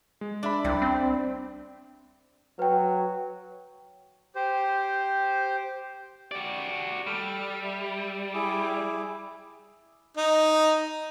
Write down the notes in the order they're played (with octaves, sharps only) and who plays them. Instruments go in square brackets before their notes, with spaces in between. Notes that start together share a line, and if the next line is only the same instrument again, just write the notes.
[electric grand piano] G#3
[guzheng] D4 [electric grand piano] D5 E5 B5
[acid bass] C2 [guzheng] G3
[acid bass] C4
[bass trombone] F#3 [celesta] B4 G5
[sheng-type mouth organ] G4 C5
[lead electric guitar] F#4 D5 [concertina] G4
[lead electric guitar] G3 [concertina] A4 F6
[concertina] E5
E4 G#4 D6
[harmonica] D#4